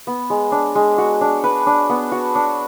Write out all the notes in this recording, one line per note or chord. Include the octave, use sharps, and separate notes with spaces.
B3
G#3
D4
G#3
F#4
D4
B4
D4
B3
F#4
D4